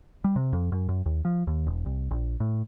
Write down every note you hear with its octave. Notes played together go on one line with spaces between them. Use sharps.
G3
C3
F2
F#2
F#2
D#2
F3
D#2
E1
C2
A#1
A2